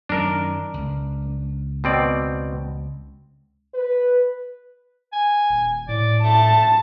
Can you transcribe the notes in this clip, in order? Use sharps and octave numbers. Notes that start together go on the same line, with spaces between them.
F#2 D#3 D4 A#4
C#2
B2 C4 D5
B4
G#5
D#1
A2 D5
A3 A5